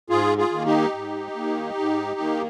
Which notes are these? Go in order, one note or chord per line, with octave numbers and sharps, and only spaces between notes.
G#2 F4 G#4
F4 G#4
D#3 A#3
D#4 G4
G#2
D#3 A#3
G#2
D#3 A#3